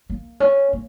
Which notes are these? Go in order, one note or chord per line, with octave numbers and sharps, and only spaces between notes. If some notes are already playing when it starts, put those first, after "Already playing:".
A#3
C#4
A#3